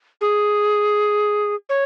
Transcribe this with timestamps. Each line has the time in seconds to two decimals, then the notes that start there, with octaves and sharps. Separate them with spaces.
0.21 G#4
1.69 C#5